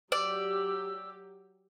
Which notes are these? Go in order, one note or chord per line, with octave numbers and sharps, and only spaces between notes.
F#3 G4 D5 E6